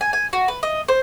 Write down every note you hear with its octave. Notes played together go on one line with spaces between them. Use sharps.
G#5
G#5
F#4
B4
D#5
C5